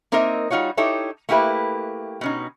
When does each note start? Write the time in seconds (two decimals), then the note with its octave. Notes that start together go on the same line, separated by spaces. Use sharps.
0.12 A#3 C4 D#4 A#4 D#5 E5
0.50 G3 D#4 F4 F#4 C#5
0.77 D#4 E4 G4 A4 C#5
1.29 A3 A#3 E4 G4 B4
2.21 B2 C#4 D#4